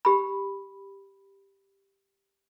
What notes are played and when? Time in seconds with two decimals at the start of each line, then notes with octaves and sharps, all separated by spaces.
0.05 G4 B5